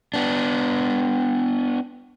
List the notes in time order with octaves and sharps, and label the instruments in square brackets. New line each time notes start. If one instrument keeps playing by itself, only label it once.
[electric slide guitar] B3 D4